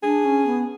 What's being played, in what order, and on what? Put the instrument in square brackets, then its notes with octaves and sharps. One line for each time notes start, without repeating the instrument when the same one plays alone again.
[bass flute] D4 [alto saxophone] G#4
[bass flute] C#4
B3